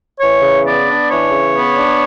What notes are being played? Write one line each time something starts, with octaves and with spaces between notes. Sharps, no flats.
E3 C#5
C#3
B3 D5
D4
E3 C#5
C#3
B3
D4